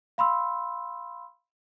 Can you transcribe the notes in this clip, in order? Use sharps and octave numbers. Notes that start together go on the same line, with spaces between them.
F5 B5 C6 E6